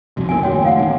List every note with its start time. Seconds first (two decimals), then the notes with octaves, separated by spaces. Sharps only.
0.17 C2 F2 F#4
0.29 F#1 D#2 A2 A#4 G#5
0.43 F#4 C#5 G5
0.65 F5 F#5
0.78 E2 A2 D#3 D#4